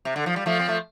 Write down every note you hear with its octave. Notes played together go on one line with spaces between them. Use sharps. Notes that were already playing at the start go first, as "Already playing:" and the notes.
C3
D3
F3
G3
F3 A3
C4
A3